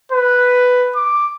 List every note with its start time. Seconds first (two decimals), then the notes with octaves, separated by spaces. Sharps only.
0.12 B4
0.96 D6